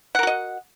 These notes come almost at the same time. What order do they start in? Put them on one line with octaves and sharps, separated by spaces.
F#5 A#4 F#4 D#5